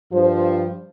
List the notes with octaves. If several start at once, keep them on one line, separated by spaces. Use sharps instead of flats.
G2 F3 C5